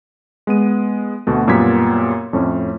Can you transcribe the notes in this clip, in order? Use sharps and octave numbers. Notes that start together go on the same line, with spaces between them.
G#3 B3 D#7
D2 B2 A3
F#2 A#2 G3 B3 G#6 B6
F2 A2 C#4